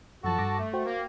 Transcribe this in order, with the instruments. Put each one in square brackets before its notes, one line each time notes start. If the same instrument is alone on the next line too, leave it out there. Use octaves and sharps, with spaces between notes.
[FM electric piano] F#2 F3 [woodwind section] F#4 A4 A5
[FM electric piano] G2 D6 A#6
[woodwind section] A3
[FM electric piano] F#4 C5 G5
[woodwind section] A#3